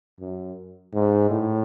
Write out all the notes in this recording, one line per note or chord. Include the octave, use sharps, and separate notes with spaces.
F#2
G#2
A2